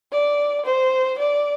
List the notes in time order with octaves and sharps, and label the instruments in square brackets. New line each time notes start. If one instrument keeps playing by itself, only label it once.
[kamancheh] D5
C5
D5